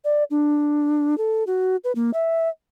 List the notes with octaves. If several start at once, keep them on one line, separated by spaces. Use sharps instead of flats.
D5
D4
A4
F#4
B4
A#3
E5